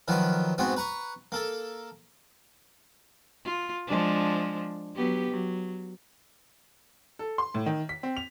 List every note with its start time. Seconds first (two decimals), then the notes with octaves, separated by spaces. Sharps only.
0.08 D#3 F3 F#3 B4
0.58 G#2 B3 C4 F#4
0.77 B4 A#5 C#6
1.32 A#3 A4
3.45 F4
3.87 F3 G#3 D4
4.95 F#3 B3 G4
5.30 F#3
7.19 A4
7.38 C6
7.55 A2
7.66 D#3
7.89 B6
8.03 C4
8.17 F7